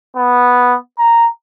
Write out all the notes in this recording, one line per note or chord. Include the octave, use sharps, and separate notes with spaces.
B3
A#5